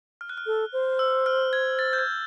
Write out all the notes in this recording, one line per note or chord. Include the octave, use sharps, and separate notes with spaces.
F6
F#6
F6
A4
C5
E6
F6
G#6
A6
G6
G#6